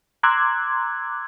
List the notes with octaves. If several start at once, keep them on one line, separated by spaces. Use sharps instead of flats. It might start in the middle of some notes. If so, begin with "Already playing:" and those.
A#5 C6 D6 E6 F#6 G#6